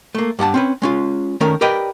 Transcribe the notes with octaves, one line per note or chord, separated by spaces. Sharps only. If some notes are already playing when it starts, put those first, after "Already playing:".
A3 A#3
G2 G4 F#5 A5
C4 C#4 B4
G#3 C#4 F4
D#3 A3 C#4 A#4
G4 A#4 B4 D5 D#5 G5